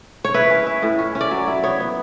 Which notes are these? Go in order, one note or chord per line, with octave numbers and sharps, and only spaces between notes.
C#5
E4 B4
C#4
E4
A2
C#4
C#4
D5
F#3
E4
B3 C#5
B3